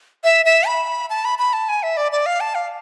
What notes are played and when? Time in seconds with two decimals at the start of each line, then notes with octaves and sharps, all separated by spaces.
0.24 E5
0.46 E5
0.67 B5
1.10 A5
1.25 B5
1.39 B5
1.53 A5
1.69 G#5
1.83 E5
1.97 D5
2.12 D5
2.26 F5
2.41 A5
2.55 F5